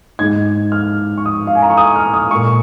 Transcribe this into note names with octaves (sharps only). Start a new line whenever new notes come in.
G#2 G#3 G#6
F6
C#6
D#6
F5
G#5
A#5
C#6
D#6
F6
D#6
A#2 G#3 C#6